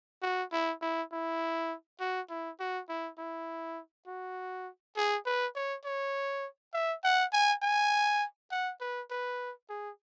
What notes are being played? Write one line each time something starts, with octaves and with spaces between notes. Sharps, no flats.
F#4
E4
E4
E4
F#4
E4
F#4
E4
E4
F#4
G#4
B4
C#5
C#5
E5
F#5
G#5
G#5
F#5
B4
B4
G#4